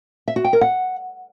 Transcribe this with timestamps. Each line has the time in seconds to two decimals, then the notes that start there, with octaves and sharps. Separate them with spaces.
0.28 E5
0.36 F#4
0.44 G5
0.53 A#4
0.61 F#5